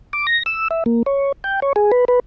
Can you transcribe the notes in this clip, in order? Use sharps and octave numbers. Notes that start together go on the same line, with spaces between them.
D6
A#6
E6
E5
A#3
C#5
G5
C#5
G#4
B4
B4